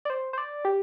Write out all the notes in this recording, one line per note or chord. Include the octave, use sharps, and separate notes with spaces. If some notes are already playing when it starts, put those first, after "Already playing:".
D5
C5
C5
D5
G4